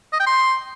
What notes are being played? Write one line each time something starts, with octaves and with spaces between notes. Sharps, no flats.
D#5
G5
C6